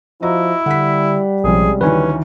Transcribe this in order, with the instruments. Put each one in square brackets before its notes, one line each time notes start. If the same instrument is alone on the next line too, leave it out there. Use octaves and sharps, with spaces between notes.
[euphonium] F3 [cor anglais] E4 [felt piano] F#4 D#5 A#5
[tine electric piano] D3 [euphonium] G3 [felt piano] F#5 B6
[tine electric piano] A#1 F3 [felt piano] C3 G#3 C#4 [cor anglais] G#4
[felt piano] D2 D#3 E3 [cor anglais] C#4 [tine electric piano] B4 G#5